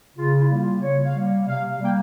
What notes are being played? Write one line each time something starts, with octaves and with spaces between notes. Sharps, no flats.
C#3 F4
E4
G3 A#3
F4
C#3 C#5
F5
G3 A#3
C3 F5
G3 A#3 G5